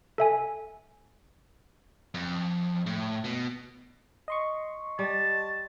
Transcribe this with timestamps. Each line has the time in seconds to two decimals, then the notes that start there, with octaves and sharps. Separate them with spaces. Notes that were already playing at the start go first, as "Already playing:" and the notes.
0.18 A4 E5 G#5
2.14 F2
2.87 A2
3.24 B2
4.28 D#5 C6 C#6
4.99 G3 A5